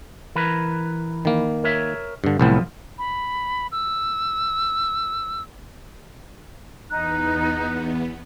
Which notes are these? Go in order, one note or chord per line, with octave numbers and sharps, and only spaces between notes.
E3 A#4 B4
D#3 A#3
A#4 C#5 E5
G2 D3
C2 A2 F3 F#3 B3 F4
B5
E6
E2 B3 D#4 F#6